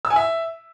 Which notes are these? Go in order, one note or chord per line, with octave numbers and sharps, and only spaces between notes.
E6
G#5
E5